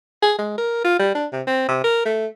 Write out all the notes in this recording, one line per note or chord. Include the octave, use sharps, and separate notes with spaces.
G#4
G#3
A#4
F4
G3
D4
C3
C4
C3
A#4
A3